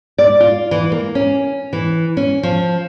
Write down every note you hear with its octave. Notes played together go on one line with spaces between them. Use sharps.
D5
F4
E3
A#3
C#4
E3
C#4
F3